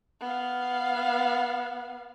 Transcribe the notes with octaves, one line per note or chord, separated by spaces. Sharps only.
B3 F5